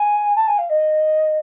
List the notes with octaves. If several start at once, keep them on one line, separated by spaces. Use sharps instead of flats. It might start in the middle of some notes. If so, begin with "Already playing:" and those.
Already playing: G#5
A5
G#5
F5
D#5